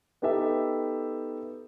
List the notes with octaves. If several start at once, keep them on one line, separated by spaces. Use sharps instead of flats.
B3 D#4 G4 A4 E5 G5